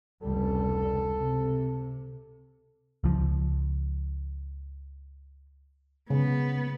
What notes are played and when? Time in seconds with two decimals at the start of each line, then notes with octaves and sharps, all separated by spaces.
0.23 F1 C#2 G3 A4
1.19 C3
3.04 C#2 F3
6.10 C#3 B3